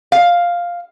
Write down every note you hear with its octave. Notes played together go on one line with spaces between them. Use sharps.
F5